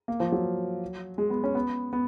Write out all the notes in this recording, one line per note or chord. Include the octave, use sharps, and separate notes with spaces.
A#3
F3
F#3
G#3
B3
C#4
B3
B3